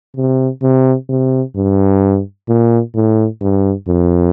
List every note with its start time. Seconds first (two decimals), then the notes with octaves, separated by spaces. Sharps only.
0.16 C3
0.62 C3
1.09 C3
1.56 G2
2.48 A#2
2.95 A2
3.41 G2
3.88 F2